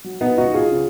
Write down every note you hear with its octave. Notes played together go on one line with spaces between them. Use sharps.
F#3
B3 D#4
C#2 D#4 F#4
F4 G#4
C#3